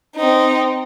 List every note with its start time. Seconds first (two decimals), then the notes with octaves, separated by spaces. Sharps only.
0.16 C4 D#4